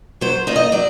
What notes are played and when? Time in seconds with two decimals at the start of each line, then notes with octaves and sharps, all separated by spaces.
0.21 F#3 C5
0.47 A#3 D#4 D5
0.56 D#5
0.72 F#3 D5